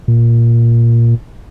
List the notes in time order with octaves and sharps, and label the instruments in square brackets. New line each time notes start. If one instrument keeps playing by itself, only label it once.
[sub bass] A#2